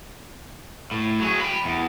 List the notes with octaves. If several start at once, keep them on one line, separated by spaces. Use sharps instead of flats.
A2
F#3 G#4
G5 B5
E2